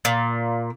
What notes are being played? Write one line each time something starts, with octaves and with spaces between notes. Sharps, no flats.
A#2